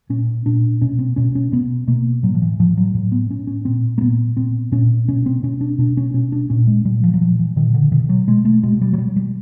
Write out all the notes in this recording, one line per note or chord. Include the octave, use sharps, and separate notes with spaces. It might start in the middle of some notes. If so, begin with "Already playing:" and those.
A#2 C#4
A#2 D4
B2 C#4
C4
B2 C#4
C#4
B2 B3
B2 A#3
A2 F#3
F3
E3
A2 F3
F#3
A2 F#3
B3
A2 C#4
C#4
A#2 C4
A#3
A#2 B3
A#2 C4
A#2 C#4
B2 C#4
C4
B2 C#4
D4
B2 D4
C#4
B2 C#4
D4
A#2 C#4
G#3
A#2 G3
F3
F#3
A#2 F3
E3
A#2 D#3
D3
B2 D#3
F#3
B2 G#3
A3
B2 G#3
G3
F#3
B2 G3
G3